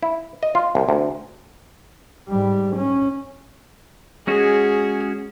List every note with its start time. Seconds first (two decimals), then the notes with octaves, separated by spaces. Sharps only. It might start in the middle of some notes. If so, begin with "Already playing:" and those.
0.03 E4
0.43 D#5
0.55 F4
0.75 C2
0.89 D2
2.28 G#2 G3
2.76 C#4
4.27 G#3 C#4 F#4 G#4